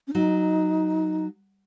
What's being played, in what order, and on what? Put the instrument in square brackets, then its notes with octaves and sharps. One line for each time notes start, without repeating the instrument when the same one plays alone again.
[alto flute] C#4
[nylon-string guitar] F#3 [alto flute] D#4